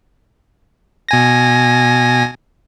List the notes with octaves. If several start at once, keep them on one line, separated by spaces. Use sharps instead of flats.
B2 G#5 A#6